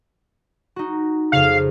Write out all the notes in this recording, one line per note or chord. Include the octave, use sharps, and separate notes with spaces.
D#4 F#4
F2 C#3 F5